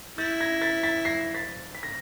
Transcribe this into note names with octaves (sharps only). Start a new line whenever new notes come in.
E4 G6 A6
G#6 A#6
A6 B6
A6 B6
A#6 C7
A6 B6
B6
A#6